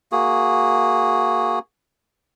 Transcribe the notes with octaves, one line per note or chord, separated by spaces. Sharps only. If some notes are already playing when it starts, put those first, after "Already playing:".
A#3 F#4 G#4